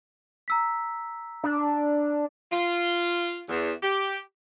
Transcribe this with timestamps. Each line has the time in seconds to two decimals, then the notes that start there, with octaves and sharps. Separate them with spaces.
0.48 A#5 E6 B6
1.44 D4
2.52 F4
3.49 E2
3.82 G4